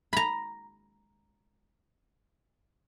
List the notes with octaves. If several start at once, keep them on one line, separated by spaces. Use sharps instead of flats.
A#5 B5